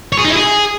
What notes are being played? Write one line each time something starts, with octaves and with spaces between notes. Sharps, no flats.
C#5
G#4
D#4
E4
G#4